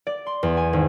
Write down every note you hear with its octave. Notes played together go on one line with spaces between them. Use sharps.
D5
C6
E2
G#5
G#1